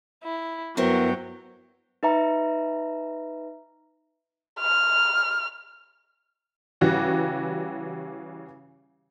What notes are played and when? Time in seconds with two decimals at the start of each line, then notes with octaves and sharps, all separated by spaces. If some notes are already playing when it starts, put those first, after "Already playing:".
0.23 E4
0.77 G2 F#3 B3 E4 A#4 C5 G5
2.03 D#4 B4 E5 A#5
4.60 F6
6.81 C#3 E3 G3 F#4 G4